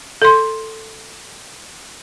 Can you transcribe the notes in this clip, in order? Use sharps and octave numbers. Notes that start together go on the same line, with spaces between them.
A4 C6